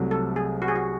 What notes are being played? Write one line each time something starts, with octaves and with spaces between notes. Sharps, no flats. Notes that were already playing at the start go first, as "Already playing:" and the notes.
Already playing: C2 C3 F#3 A3
A4
G#4
F#4
G#4
F#4